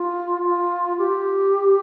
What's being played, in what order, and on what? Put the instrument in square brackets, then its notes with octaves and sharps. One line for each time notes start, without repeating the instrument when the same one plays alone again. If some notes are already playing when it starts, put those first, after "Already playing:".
Already playing: [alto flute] F4
F4
G4